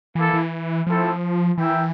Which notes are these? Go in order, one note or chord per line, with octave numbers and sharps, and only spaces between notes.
E3 A#3 E4 A4
E3
F3 A3 C4 E4 A4
E3 E4 A#4 E5 G5